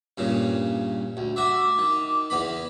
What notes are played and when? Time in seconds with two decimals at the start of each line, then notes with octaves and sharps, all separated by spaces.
0.18 G2 A#2 C#3
1.17 D2
1.36 F#4 E5 D6
1.78 D#3
2.30 E2 B3 B5